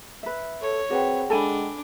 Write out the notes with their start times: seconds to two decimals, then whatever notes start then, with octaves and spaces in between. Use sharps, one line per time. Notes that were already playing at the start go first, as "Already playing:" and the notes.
0.23 B4 E5
0.62 A4 C#5
0.90 C4 F#4 G#4 B4 F#5 G5
1.30 G#3 D4 A4 G#5 B5